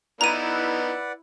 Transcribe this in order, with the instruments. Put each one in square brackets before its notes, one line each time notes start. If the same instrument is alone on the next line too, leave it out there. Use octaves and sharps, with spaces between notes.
[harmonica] B3 D#4 [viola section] E4 [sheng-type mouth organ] B4 D5 F#5 [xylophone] A#5 D#7